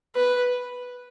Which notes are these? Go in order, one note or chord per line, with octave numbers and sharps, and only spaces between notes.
B4